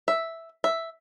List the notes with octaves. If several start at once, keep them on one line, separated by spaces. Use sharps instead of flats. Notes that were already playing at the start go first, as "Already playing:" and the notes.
E5
E5